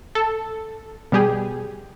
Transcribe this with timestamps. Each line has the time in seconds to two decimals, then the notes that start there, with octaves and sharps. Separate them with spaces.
0.15 A4
1.12 B2 G3 G4 G#4